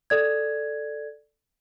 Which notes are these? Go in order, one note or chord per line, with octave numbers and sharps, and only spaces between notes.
A4 D5 G#6